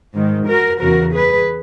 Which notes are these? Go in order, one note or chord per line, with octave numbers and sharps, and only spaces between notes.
G#2 D#3
F#4 A#4
E2 C#3 E3 F#4 A#4
G#4 B4